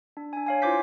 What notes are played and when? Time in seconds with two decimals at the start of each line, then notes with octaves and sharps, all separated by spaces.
0.17 D4
0.33 D4 G#5
0.46 C#5 F5 G#5
0.62 E4 F4 C5 D6 G6 B6